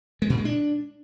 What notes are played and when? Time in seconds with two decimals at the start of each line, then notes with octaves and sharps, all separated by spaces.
0.22 G#3
0.30 A#2
0.37 G#3
0.45 D4